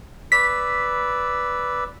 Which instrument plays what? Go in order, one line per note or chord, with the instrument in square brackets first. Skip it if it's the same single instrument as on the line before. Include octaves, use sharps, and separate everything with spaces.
[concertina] B4 D5 E6 [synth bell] B6